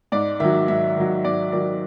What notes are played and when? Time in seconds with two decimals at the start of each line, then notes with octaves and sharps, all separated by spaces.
0.12 G#2 D5
0.40 D#3 F#3 E5
0.68 G#2 E5
0.97 D#3 F#3
1.25 G#2 D5
1.52 D#3 F#3 D5